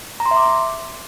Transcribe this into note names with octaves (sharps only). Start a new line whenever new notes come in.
A#5
C6
E5
D6